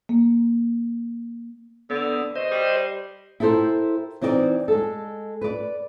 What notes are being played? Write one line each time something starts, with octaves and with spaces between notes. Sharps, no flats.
A#3
D3 B3
B2 C5 D#5
G3
E4 G4 A4 A#4 C5
E3 C4 D#4 D5
G#3 A4
B4 D5